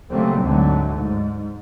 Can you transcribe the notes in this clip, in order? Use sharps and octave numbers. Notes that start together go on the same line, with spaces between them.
C#3 F#3 G3 A3 A#3 C4
D2 G#2 D3 F#3 A3
G#2